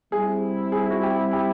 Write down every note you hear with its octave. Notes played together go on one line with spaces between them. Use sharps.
G3 C4 E4 G#4
G#4
F#4
G4
G4